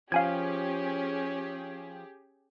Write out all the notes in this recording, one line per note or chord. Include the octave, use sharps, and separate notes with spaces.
F3 C#4 G4 G#4 F5 G#5 G#6